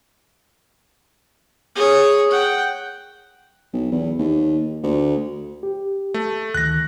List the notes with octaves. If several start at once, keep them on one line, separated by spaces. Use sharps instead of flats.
G#4 C#5
F#5 G5
B1
E2
D#2
D2
G4
A3
D2 D#3 F#6 A#6